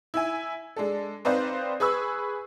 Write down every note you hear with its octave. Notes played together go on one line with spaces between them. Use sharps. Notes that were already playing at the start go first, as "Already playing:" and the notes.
E4 E5 G#5
G#3 D4 A4
C4 D#4 B4 C5 D5 F5
G#4 B4 B5 C#6 E6